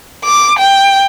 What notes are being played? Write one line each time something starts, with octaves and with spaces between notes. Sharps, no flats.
D6
G5